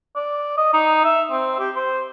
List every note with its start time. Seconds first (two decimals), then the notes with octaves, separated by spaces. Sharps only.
0.15 D5
0.57 D#5
0.73 D#4
1.04 E5
1.31 C4
1.59 G4
1.76 C5